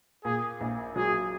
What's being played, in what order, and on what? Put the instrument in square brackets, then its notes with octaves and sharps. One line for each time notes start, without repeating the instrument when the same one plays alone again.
[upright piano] A#2 [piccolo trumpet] G#4
[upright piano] A#1
[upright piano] F#3 [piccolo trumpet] G#4